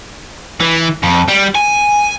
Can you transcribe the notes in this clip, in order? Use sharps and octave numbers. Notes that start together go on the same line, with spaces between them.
E3
F2
G3
G#5